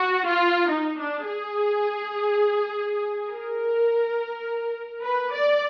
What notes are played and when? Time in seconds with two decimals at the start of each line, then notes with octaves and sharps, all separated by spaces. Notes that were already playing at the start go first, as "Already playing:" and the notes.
Already playing: F#4
0.26 F4
0.70 D#4
0.98 D4
1.27 G#4
3.29 A#4
5.03 B4
5.32 D5